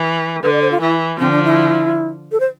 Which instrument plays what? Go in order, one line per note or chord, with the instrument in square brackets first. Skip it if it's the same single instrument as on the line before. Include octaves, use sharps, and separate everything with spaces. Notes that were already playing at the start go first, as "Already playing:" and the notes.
Already playing: [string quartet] E3
[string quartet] D3 [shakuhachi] B4
[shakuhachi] D5
C5
F4
[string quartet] E3 [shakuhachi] E4
[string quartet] D3 F3 [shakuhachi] C4
[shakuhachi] D4
E4
A4
C5